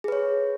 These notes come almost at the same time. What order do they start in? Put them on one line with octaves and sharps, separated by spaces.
G#4 B4 C#5